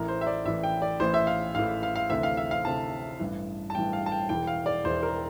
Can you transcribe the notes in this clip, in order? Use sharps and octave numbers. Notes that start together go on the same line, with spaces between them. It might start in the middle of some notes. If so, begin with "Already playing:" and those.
Already playing: A1 A2 E3 A#4
C5
E5
D5
A1 A2 E3 E5
G5
D5
A1 A2 E3 C5
E5
F5
A1 A2 E3 F5
F5
F5
D2 C3 E3 E5
F5
E5
F5
D2 C3 E3 A5
A1 G2 E3
A5
A1 G2 E3 G5
F5
A5
G5
E1 E2 E3 G5
F5
D5
E1 E2 E3 C5
A#4